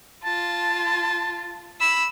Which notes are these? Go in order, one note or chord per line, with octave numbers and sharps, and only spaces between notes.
F4 A5
B5 E6